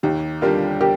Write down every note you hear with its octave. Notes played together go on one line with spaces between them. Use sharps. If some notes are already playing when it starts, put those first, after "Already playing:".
D#2 D#4 G4
D3 G3 D4 F4 G4 A#4
G4 A#4